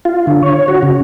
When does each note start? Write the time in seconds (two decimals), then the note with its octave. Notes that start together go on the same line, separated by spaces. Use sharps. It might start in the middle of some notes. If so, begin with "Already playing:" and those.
0.05 F4
0.27 D3
0.43 C#5
0.68 F#4
0.83 C#3